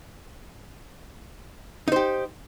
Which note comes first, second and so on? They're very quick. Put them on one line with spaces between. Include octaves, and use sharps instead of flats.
D#4 C5 G4